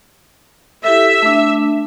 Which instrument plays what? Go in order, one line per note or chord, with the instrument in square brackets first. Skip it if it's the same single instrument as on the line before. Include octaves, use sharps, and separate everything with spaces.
[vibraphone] E4 G4 A4 [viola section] E5
[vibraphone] A3 D4